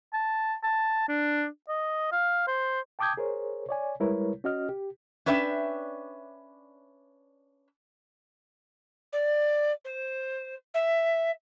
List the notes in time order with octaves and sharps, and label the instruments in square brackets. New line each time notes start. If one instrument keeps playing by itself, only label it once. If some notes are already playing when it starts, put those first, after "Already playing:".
[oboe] A5
A5
D4
D#5
F5
C5
[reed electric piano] G5 A5 D6 D#6 G6 G#6
G#4 A#4 C5 C#5
C#5 D5 G#5
G3 G#3 E4 A#4 B4 C#5
C#4 F#4 D#5 F6
G4
[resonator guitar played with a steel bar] C#4 D4 B4 E5 G5
[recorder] D5
C5
E5